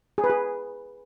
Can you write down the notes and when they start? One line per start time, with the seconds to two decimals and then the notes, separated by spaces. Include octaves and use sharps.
0.18 G#4
0.24 B4
0.30 G#4